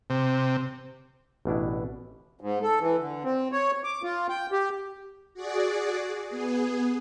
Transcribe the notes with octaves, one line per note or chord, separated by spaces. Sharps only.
C3
A1 B2 D4 E4
G#2
A4
E3
D3
C4
C#5
D6
F4
G5
G4
F#4 G#4 D5
B3 G#4